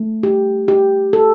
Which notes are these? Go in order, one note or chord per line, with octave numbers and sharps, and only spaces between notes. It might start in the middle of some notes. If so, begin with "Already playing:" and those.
Already playing: A3
G4
G4
A4